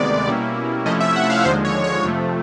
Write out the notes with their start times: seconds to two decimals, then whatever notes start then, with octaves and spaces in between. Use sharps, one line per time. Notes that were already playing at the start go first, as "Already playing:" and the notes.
Already playing: D2 C3 D#3 G#3 B3 D5
0.27 B2 G3 A#3 C#4 E4
0.86 C3 F3 A3 C#4 E4 D#5
1.01 E5
1.16 F#5
1.30 F5
1.45 D#2 D3 F3 G#3 C5
1.65 C#5
1.84 C#5
2.04 F2 C3 F3 A3